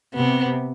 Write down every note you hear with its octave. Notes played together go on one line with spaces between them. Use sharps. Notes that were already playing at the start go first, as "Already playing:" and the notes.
C3 B3